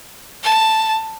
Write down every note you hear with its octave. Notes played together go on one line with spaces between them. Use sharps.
A5